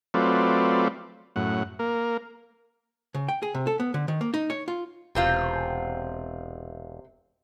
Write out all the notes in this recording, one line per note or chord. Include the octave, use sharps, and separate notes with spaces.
F#3 A3 C4 F4 B4 D5
F#2 A2 F#5
A#3 A#4
C#3
G5
G#4
C3
A4
B3
D3
D#3
A#3
D#4
C#5
F4
E1 C3 C4 F4